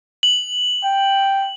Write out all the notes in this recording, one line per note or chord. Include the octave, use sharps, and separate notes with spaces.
F#7
G5